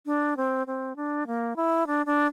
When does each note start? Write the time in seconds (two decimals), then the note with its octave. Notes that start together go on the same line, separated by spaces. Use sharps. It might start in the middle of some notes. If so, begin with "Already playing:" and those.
0.06 D4
0.37 C4
0.67 C4
0.96 D4
1.27 A#3
1.56 E4
1.87 D4
2.06 D4